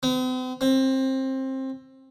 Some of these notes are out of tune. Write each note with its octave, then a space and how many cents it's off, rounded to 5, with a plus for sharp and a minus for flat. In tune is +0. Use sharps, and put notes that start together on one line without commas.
C4 -45
C4 +20